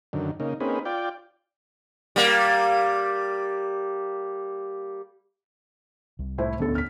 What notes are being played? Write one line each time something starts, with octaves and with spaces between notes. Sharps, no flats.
F#2 D3 D#3
C#3 A#3 D#4
A#3 C4 C#4 D#4 G#4 B4
F4 D5 G5
G3 A#3
C2
A2 E4 C5
D2 D3 B3 C#4 A4
F6 B6